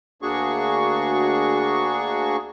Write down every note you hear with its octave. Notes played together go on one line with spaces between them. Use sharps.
D2 A#3 D4 F#4 G#4 C#6